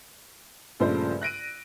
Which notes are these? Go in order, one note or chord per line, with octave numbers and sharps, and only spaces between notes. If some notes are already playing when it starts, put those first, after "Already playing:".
A#1 G2 C#3 F3 A3 C5
F#6 A#6 D7 D#7